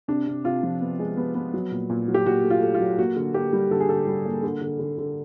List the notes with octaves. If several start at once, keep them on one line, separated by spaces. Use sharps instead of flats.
C3 D4
C3
C3 F4
F3
B3
G#3
B3
B3
F#3
A#2
A#2
F#3
G4
A#2 F#4
A3
F4
A3
F4
F#3
A#3 F#4
D3
A#3 G4
G3
D3 A4
G#4
D3 A4
G3
A#3
D3
D3
D3
D3